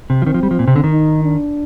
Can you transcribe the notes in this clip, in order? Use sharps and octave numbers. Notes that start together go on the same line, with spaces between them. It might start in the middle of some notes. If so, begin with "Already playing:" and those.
C3
F3
D#3 C4
F3
G3
F3
A#2
C3
D3
D#3
D#4
D4